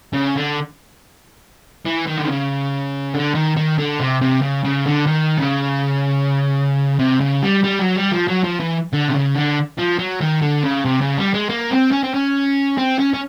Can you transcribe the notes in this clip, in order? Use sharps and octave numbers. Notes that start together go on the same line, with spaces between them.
C#3
D3
E3
D#3
D3
C#3
D3
D#3
D#3
D3
C3
C3
C#3
C#3
D3
D#3
C#3
C3
C#3
G3
G3
F#3
G3
F3
F#3
F3
E3
D3
C3
C#3
D3
F3
F#3
D#3
D3
C#3
C3
C#3
G3
G#3
A#3
C4
C#4
C4
C#4
C4
C#4
C#4